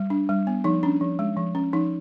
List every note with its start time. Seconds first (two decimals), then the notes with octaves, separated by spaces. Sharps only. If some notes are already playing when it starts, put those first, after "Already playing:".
Already playing: G3
0.10 D4
0.29 G3
0.47 B3
0.64 F3 D#4
0.83 C#4 D4
1.01 F3
1.19 G#3
1.37 F3
1.55 C#4
1.73 F3 D#4